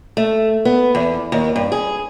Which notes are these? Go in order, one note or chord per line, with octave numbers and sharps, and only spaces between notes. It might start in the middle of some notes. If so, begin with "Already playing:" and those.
A3
B3
E2
D#2
G2
G#4